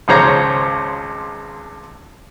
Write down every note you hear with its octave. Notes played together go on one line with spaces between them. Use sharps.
G#1 C#2 F3 C5 C#5 A#5